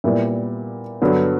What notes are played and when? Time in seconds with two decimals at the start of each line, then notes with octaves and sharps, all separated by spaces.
0.04 A#2 G3 B3 E4
1.02 G2 D3 F#3 B3